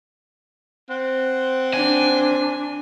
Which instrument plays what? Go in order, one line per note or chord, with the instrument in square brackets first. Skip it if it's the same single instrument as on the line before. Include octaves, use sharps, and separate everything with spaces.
[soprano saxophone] C4 [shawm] F#5
[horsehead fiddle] D4 [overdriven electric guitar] G#5